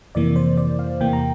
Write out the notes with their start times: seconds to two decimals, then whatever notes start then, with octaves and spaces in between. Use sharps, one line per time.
0.15 F2 C3 E3 A#3 D5
0.36 C5
0.57 D5
0.79 F5
1.00 E2 C3 E3 A#3 G5
1.13 A#5